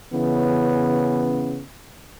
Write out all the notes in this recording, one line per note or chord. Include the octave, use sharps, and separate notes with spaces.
C#3 E3 B3 C#4